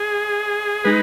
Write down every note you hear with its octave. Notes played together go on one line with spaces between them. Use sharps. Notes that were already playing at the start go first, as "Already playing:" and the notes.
Already playing: G#4
G#3 D#4 B4